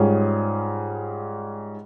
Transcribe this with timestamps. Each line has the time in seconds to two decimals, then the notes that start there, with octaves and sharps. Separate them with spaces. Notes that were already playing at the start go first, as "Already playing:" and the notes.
Already playing: G#2 G3 C#4 F4 G#4